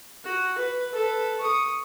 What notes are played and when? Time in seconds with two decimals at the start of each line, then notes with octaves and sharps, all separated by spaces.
0.25 F#4
0.58 B4
0.93 A4 B4
1.40 C#6 D#6